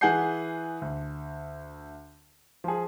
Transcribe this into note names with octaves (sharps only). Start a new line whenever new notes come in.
E3 G#4 F#5 G#5 G6 C7
D2
F3 G#4